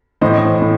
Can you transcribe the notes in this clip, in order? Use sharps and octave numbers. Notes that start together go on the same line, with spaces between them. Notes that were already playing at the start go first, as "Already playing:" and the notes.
A2 E3 C5 D#5
A2